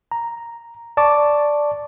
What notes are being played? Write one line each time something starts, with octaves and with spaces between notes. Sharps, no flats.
A#5
D5 A5 C#6 D6